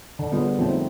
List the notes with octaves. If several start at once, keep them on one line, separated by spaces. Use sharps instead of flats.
D3
G3 B3 F4 G#4
F3 A3 C4 D#4